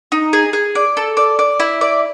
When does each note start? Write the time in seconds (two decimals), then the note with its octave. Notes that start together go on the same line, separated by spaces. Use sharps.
0.12 D#4
0.33 G#4
0.53 G#4
0.75 D5
0.97 A4
1.17 D5
1.39 D5
1.60 E4
1.81 D5